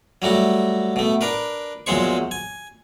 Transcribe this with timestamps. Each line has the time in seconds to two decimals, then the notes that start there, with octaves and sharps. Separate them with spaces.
0.22 F#3 G3 A3 F#4
0.96 B2 A3
1.21 D4 A#4 B4
1.86 A#1 E2 F#3 G#3 C5 C#6
2.31 G#5